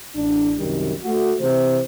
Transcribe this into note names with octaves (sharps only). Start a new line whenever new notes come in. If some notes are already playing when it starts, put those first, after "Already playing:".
A1 D4
C2 F#2 D#3 G3
A3 F#4
C3 E3 C5